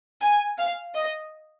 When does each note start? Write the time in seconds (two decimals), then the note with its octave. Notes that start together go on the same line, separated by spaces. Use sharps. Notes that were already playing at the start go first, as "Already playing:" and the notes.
0.21 G#5
0.58 F5
0.95 D#5